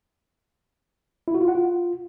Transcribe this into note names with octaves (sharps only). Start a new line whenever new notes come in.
E4
F#4
F4
F#5
F4